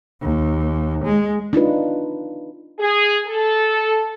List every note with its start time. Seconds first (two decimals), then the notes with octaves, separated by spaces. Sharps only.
0.22 D#2
1.04 G#3
1.53 D4 D#4 F4 B4
2.80 G#4
3.27 A4